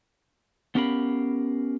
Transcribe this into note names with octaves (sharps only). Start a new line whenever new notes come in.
B3 C#4 G4 A#4 F5 B5